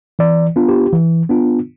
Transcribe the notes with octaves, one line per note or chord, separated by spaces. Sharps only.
E3 D5
B3 D4 F4
G4
E3
B3 D4 F4